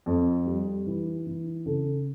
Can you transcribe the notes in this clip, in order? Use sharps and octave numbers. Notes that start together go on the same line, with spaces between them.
F2
G3
E3
E3
C#3 A4